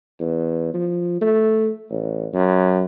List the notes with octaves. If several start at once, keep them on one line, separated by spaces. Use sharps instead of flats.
E2
F3
A3
A1
F#2